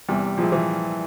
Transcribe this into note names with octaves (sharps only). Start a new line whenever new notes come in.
E2 C3 E3 G3
A#2 F3 G#3 E4
E3